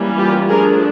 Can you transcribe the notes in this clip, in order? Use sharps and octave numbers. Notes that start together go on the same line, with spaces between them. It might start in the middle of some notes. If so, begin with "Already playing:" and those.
Already playing: E3 G3 A#3 C#4
F4 G4
F3 A3 D4 G#4 A#4